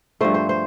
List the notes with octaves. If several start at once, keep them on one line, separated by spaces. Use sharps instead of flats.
G2 F3 A3 C5
C5
C5